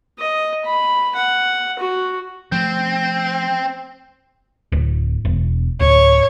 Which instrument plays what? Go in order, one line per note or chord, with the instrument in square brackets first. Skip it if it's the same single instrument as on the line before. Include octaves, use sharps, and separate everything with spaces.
[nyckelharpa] D#5
B5
F#5
F#4
[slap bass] F3 A3 [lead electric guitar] C4
[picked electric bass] D1
E1
[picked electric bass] D1 [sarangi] C#5